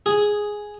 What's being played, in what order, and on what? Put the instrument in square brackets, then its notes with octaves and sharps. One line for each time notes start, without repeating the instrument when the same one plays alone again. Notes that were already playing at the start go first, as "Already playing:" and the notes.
[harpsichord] G#4